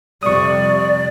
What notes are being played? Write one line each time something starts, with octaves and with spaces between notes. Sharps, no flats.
F2 C3 G3 D5 C#6 D#6